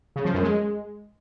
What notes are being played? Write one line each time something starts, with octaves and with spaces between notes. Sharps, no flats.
C#3
F3
F#2
G#3